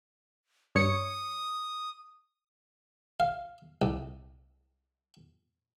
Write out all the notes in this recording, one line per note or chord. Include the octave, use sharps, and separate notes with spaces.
G2 C#5 D#6 C#7
F5
C2